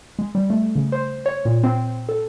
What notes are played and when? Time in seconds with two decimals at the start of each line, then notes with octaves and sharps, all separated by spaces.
0.19 G#3
0.35 G3
0.50 A3
0.75 C#3
0.92 C5
1.26 C#5
1.45 A#2
1.63 C4
2.09 A4